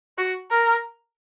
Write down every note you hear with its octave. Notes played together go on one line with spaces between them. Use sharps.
F#4
A#4